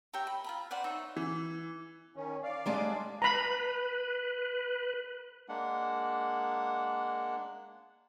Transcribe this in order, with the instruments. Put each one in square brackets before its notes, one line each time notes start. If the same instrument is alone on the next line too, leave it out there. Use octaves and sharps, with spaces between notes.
[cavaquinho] G4 C#5 E5 A#5
B5
F4 A#5 B5
B4 C5 D5 F#5
D#4 C#5 D5 E5
[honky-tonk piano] E3
[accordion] D#3 C#4
D5 F5
[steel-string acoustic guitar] G3 G#3 D4
[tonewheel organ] B4 [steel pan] A#5 B5
[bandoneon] G#3 A#3 D4 F#5